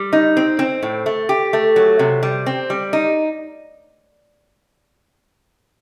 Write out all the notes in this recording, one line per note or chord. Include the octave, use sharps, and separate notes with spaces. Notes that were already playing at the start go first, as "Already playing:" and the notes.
Already playing: G3
D#4
C4
C4
A2
A3
G4
A3
F#3
C3
G3
C4
G3
D#4